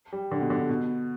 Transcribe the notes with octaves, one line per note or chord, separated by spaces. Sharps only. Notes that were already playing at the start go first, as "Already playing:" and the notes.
G3
D3
B2
D3
B2